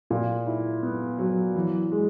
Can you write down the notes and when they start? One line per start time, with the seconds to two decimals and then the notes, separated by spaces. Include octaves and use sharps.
0.10 A#2
0.47 E4
0.83 B3
1.19 F#3
1.56 E3
1.92 G#3